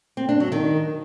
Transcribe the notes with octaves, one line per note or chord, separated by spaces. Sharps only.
C4
D4
F#3
D#3